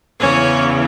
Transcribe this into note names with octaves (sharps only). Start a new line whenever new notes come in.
E2 C#3 E3 C#4 C#5